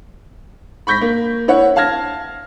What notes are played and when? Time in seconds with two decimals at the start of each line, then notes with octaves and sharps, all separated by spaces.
0.87 B5 C#6 G6 A#6 B6
1.01 A#3
1.48 E4 C#5 F#5
1.76 F5 A5 F6 G#6 A#6